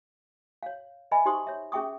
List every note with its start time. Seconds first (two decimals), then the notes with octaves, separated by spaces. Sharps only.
0.63 C#5 F5
1.11 B4 D#5 E5 G#5 B5
1.25 D#4 G4 C5 C6 C#6 D#6
1.47 C#5 E5
1.72 C#4 G#4 E5 G5 C#6 D#6